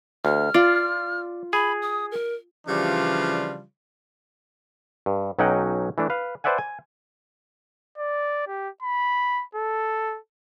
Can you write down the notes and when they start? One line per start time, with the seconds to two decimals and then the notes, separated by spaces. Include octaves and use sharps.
0.25 D2 F6
0.54 F4 D5
1.53 G#4 B5
1.82 D#6
2.12 A#4
2.67 C#3 E3 F3 G3 D4 F4
5.06 G2
5.39 B1 F#3 C#4 D#4 F#5 G5
5.98 E3 A3 D4
6.10 B4 F5
6.44 B4 C5 D5 E5 F#5 G#5
6.58 G#5
7.98 D5
8.47 G4
8.83 B5
9.55 A4